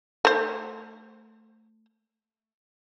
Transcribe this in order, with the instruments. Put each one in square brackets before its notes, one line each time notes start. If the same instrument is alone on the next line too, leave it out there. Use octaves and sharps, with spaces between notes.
[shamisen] A3 C5